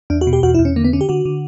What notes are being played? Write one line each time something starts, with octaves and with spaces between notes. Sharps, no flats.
E2 D4
F#4
B2
G4
E2 F#4
E4
E2
C#4
D3 A#3
B3
D3 C#4
G4
D3 F#4
D3